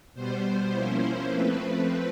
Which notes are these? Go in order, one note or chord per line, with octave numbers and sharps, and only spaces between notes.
B2 G3 B3 C5
F3 A#3 C#4 E4
F3 A3 C4 B4
B4